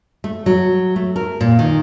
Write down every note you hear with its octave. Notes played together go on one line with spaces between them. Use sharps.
A3
F#3
A3
A#4
A#2
D#3